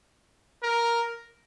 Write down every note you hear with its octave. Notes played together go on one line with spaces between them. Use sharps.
A#4